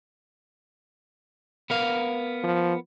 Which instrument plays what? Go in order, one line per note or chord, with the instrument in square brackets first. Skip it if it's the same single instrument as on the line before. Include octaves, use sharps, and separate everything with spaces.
[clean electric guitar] B3 A#4 F5
[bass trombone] F3